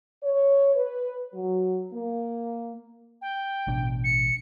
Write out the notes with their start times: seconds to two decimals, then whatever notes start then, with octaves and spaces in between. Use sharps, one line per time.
0.23 C#5
0.75 B4
1.34 F#3
1.93 A#3
3.22 G5
3.67 A1 B2 D4
4.04 C#7